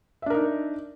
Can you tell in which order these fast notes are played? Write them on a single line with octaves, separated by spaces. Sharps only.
E5 D4 A#4 D#4